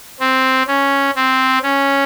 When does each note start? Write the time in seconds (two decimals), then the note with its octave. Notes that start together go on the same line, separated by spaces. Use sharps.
0.20 C4
0.67 C#4
1.15 C4
1.63 C#4